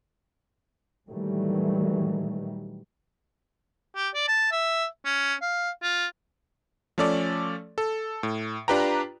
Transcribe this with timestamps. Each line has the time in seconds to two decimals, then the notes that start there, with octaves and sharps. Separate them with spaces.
1.09 A#2 D#3 E3 F#3 G3 A3
3.96 G4
4.15 D5
4.28 A5
4.52 E5
5.05 C#4
5.42 F5
5.83 F4
6.98 F3 A3 C#4 A4 D5
7.78 A4
8.23 A2
8.68 D4 F4 G4 B4 G5 A#5